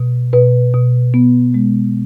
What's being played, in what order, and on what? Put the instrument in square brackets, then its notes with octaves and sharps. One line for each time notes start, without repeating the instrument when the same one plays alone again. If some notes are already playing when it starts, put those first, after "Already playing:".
Already playing: [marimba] B2
B2 B4
B2
B3
G#3